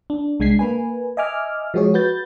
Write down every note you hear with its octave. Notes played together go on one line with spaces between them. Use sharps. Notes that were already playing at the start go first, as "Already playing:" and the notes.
D4
C2 G#3 D4 G#6 B6 C7
A#3 B4 G#5
D#5 E5 G#5 D6 F6
F3 G#3 F#4 G#4 C#5
F#4 B4 G6 A6